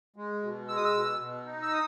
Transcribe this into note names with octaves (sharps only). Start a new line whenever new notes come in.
G#3
B2
G#3 E6
D#6
E6
B2
B2
D#4
E6
D#6